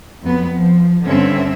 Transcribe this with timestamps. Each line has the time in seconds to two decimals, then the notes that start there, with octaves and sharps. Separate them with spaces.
0.22 F2 F#3 B3
0.54 F3
1.06 G2 D3 C4 C#4 E5